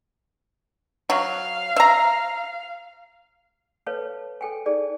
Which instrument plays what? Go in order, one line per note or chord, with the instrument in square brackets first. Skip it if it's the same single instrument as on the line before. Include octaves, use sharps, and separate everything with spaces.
[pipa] F#3 [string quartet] F5
[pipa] E5 A#5
[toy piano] A4 B4 C#5 F5 A5
A4 G5 G#5
D#4 G#4 A4 D5